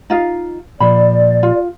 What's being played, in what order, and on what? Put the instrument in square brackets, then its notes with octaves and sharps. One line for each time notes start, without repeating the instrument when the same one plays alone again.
[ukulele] D#4 F4 F5
[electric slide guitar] A#2 F3 [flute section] D5 [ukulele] B5
[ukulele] F4